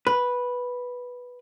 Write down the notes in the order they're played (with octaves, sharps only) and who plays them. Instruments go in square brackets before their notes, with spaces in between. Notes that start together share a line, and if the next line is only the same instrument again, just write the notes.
[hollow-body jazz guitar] B4